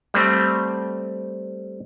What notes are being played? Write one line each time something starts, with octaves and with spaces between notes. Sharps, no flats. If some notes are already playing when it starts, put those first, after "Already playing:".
G3 A3 C4